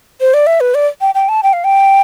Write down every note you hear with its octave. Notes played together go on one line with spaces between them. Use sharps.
C5
D5
E5
B4
D5
G5
G5
A5
G5
F5
G5